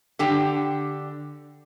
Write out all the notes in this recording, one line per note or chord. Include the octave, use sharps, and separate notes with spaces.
D3 G4 G5